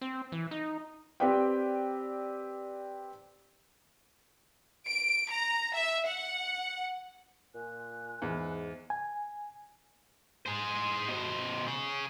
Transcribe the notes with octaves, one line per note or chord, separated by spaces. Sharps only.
C4
E3
D#4
C4 G4 B4 D5 G5
D7
A#5
E5
F#5
A#2 F4 G#5 F#6
E2 G#2
G#5
G#4 C5
B2 C5
G#4 C#5